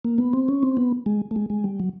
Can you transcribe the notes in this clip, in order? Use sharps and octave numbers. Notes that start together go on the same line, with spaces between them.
A#3
B3
C4
C#4
C4
B3
G#3
A3
G#3
G#3
G3
F#3